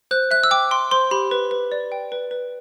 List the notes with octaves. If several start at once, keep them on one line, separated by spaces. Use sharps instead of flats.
C5 F#6
E5 F#6
E6
G5 D6
G5 C6
C5 C6
G4 B5
B4
B4
D5
G5
B4
B4